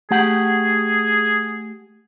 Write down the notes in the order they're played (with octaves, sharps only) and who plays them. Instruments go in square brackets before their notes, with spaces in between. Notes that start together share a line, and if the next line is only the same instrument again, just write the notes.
[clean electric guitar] A3 G4 F#5 [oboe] G#4